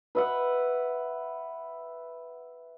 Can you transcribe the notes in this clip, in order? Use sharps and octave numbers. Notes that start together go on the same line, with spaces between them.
B4 E5 F#5